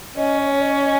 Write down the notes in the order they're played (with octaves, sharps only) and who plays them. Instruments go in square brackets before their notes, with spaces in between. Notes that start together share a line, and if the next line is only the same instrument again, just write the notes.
[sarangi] C#4 [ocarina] D#5
[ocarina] C#5
D#5
D#5